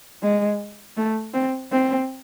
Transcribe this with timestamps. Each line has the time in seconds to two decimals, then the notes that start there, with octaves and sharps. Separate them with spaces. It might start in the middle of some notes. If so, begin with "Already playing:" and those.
0.22 G#3
0.97 A3
1.34 C4
1.72 C4